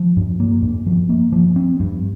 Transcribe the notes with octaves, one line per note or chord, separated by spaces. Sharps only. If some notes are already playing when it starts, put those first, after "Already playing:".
Already playing: F3
G2
A#3
G2
F3
A#3
F3
C4
G2